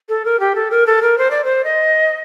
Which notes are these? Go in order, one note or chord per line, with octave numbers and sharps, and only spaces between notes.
A4
A#4
G4
A4
A#4
A4
A#4
C5
D5
C5
D#5